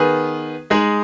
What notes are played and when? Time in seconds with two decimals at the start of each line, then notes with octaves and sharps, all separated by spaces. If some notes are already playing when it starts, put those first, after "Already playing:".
Already playing: D#3 B3 G#4 B4
0.70 G#3 D#4 G#4